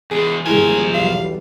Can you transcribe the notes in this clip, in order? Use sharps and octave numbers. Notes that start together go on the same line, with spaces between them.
E2 G#3 G#4
G1 D#3 F3 G#3 E4 A#4 G#5
B1 E2 G3 F5